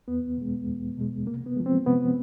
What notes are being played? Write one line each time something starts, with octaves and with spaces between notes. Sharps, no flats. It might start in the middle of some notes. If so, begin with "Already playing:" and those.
E2 B3
B2 G#3
E2
B2 G#3
C3 A#3
B3
F3 G#3
C4
C3 B3